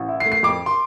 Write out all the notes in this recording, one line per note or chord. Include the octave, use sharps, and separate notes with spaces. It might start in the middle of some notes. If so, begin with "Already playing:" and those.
Already playing: A1
E4
C7
A3
C7
F2 D6
C6